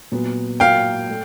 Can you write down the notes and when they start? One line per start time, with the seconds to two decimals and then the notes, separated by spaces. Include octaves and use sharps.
0.12 A#2 F#3 B3
0.60 A#2 F#3 A#3 F5 G5
1.10 A3